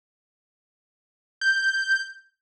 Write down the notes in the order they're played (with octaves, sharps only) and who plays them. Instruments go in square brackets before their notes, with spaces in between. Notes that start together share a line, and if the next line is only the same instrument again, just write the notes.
[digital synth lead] G6